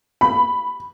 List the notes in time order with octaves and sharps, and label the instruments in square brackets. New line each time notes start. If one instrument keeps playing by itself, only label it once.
[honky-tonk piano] B5